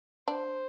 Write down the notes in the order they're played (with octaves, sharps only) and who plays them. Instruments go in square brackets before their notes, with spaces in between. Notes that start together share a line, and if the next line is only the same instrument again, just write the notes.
[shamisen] D4 [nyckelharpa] C5